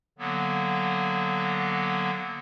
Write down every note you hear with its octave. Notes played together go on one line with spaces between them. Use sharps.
D3 F#3 A#3 B3